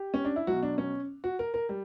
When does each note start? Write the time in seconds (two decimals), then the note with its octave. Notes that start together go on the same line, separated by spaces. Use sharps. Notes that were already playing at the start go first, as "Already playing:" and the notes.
Already playing: G4
0.14 C#4
0.25 D4
0.36 E4
0.47 B2 F#3 F#4
0.63 D4
0.78 C#4
1.24 F#4
1.39 A#4
1.54 A#4
1.69 G3